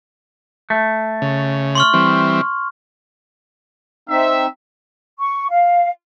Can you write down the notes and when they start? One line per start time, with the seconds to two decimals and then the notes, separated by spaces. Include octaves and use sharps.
0.70 A3
1.22 C#3
1.75 C6 C#6 F6
1.93 E3 G3 C4
4.09 C4 D#4 E5
5.20 C#6
5.51 F5